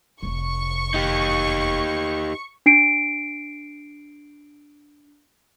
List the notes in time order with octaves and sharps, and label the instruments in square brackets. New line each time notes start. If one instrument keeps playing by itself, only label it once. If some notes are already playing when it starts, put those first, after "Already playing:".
[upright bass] F1 C3 [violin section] C#6
[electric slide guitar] D#4 G4
[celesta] D4 C7 D7